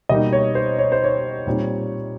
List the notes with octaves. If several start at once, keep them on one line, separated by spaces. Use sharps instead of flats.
B2 G3 A#3 D#4 D#5
C#5
C5
C#5
C5
C#5
A#2 G3 C4 D#4